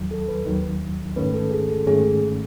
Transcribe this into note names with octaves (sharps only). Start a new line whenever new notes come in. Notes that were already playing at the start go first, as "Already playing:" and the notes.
Already playing: D#2 D#3 F#3
A4
B4
D#2 D#3 F#3
G#2 D#3 A3 C#4 B4
A4
G#4
A4
G#2 D#3 A3 C#4 G#4